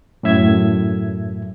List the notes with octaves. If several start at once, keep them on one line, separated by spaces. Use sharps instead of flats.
F#2 A2 E5 G#6